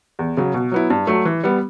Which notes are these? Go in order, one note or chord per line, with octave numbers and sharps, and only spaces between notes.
E2
C#3 F#3
B2
F#3 B3 E4
G2
F#3 A3
E3
G3 B3